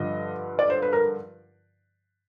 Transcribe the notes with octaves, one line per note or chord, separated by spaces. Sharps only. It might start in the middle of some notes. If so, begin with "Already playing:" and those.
Already playing: G2 D3 F3 D#5
D5
C5
B4
A#4